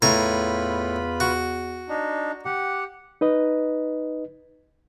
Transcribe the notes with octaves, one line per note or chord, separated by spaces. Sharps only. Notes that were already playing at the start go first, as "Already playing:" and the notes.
E2 A2 F4 B4 G#5 A#5 B5
F#4
D4 D#4
G4 F#5
D#4 B4 D#5